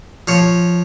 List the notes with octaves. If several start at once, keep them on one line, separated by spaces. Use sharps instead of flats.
F3 C#5